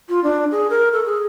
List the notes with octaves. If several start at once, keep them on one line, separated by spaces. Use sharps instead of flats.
F4
D4
G#4
A#4
A4
G#4